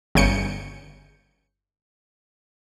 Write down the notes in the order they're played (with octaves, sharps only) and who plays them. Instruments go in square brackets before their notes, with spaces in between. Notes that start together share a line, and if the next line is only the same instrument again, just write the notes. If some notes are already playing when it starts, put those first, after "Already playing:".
[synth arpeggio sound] G1 C#3 G6 C#7